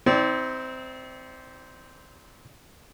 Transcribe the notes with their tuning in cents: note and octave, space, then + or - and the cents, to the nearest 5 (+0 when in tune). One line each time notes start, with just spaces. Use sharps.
C4 -10 D#4 +45 D5 -30